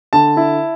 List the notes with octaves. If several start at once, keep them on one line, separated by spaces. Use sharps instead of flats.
D3 A5
E4